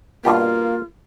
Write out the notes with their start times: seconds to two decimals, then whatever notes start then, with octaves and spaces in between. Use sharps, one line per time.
0.25 G2 B2 A#3 F4 G4